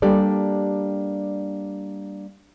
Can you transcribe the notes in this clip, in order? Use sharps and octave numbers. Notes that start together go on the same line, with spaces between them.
G3 A#3 D4 G4 A4 D5